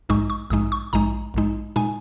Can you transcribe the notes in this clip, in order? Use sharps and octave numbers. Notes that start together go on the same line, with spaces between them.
A#1 G#2 G#3 D#4 C#6
C#6
A#1 G#2 G#3 D#4 D#6
C#6
A#1 G#2 G#3 D#4 A#5
A#1 G#2 G#3 D#4
A#2 G#3 D#4 G#5